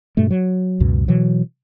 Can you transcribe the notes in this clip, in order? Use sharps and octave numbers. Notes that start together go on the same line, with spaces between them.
G2 B2 A3
F#3
C#2 F#2 B2
B2 E3 F#3